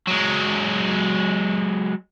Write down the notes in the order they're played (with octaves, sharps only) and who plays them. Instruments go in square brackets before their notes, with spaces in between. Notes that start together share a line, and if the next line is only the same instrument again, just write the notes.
[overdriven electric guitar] F#3 G#3